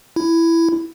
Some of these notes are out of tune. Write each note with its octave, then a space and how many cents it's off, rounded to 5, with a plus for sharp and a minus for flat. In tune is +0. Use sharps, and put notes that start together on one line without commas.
E4 +10